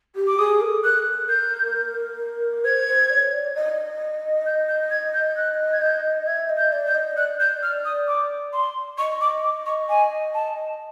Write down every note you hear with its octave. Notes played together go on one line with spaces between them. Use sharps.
G4
D6
G#4 D#6
A#4
A4
A#4 F#6
G6
C5 G#6
C5
D5
C#5
D5
D#5
G6
G6
G#6
G6
F#6
G#6
G6
E5 G#6
D#5
G6
D5
G6
D#5
D5 F#6
G6
F6
D#6
D6
C6
D#5 C#6
D6
D6
C#6
G#5
A5